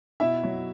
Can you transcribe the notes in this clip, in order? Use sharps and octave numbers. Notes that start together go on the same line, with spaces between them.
B2 E4 E5
F#3